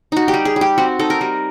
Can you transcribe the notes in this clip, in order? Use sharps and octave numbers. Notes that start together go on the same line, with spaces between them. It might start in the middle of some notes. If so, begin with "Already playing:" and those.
D#4 F#4
G4
G3
G#4
G3
G4
C4 F#4
D#4 A4
A#4
G3